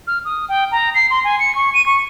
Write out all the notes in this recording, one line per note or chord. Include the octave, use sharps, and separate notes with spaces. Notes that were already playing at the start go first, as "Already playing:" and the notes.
F6
D#6
G5
A#5
C7
C6
G#5
C#7
C#6
D#7
C#6